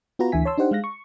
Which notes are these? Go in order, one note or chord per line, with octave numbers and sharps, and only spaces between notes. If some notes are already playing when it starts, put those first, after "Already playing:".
B3 F4 F#4 B4 A#5
D2 D3 E3 E5 G#5 B6
C#5 A5 C6 E6
D4 D#4 G4 C5 F#5
G#3 F5 F#6 A#6
C#6